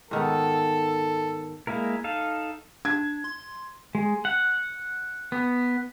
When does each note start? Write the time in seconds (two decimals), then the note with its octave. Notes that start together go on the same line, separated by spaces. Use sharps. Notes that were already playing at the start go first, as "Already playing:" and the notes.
0.11 G#2 D#3 B3 A4
1.67 G#3 A#3 E4 A#4
2.04 D#4 A4 F5
2.85 D4 G#6
3.24 C6
3.95 G#3
4.25 F#5
5.32 B3